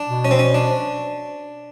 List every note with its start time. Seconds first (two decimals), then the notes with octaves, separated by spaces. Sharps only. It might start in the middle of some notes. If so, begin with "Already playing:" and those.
Already playing: D4
0.09 B2
0.25 C#4
0.31 C4
0.39 C#4
0.55 D4